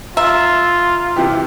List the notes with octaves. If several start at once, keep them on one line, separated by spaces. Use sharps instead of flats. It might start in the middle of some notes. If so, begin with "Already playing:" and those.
F4 E5 A#5
C3 E3 G4